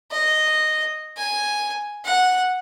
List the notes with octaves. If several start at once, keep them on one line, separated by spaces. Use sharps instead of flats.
D#5
G#5
F#5